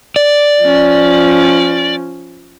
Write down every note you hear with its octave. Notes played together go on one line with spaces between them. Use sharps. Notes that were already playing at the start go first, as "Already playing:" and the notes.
D5
F3 C#4